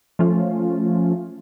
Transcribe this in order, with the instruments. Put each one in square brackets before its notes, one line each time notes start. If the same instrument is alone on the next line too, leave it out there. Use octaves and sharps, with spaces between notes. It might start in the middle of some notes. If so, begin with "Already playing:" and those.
[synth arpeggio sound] F3 A3 C#4 F4